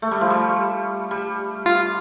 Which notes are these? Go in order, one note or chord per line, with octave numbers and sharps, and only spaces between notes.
A3
G3
F3
G3
G3
F4